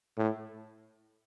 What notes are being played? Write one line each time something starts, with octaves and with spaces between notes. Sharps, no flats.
A2